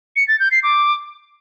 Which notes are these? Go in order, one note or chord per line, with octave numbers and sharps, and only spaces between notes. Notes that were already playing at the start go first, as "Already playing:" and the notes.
C#7
A6
G6
C7
D6